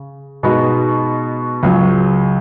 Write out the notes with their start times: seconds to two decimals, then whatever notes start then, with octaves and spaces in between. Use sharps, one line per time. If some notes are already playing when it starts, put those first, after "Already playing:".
Already playing: C#3
0.43 B2 G#3 B3 D#4 F#4
1.63 C#2 C#3 F#3